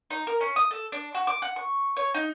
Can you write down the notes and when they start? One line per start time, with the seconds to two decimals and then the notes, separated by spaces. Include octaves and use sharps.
0.11 D#4
0.27 A#4
0.41 C#4
0.56 D#6
0.71 A4
0.92 D4
1.15 F#4
1.27 D6
1.42 F#5
1.56 C#6
1.97 C#5
2.14 D#4